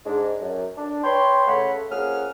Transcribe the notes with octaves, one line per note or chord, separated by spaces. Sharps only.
G#2 G#3 D4
F#2
D4
B4 C#5 G5 C6
C#3 A3 A4 C#5 F#5 B5
F2 A#3 C#4 G#4 F#5 F6